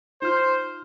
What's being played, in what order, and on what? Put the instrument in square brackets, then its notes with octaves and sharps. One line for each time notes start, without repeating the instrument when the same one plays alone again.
[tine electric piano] D#4 F4 F6 [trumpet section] C5